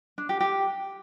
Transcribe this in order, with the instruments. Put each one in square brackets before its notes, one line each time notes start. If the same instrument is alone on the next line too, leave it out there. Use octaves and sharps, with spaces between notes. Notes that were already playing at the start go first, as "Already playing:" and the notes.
[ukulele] D4
G4
G4